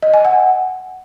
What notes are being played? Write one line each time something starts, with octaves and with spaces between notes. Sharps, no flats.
D#5
G#5
F#5